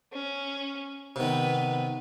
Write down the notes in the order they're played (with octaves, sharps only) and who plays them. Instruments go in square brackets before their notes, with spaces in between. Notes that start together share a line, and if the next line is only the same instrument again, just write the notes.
[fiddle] C#4
[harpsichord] C3 D#3 [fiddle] B3 B4